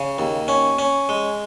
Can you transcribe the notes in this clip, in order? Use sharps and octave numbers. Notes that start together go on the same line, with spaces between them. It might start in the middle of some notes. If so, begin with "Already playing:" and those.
Already playing: C#3
D#2
C#4
C#4
G#3